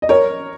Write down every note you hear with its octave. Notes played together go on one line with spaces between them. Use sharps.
D#5
A#4 C#5